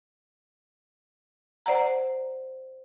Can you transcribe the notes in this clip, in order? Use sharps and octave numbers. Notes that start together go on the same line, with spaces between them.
C5 D5 F#5 A#5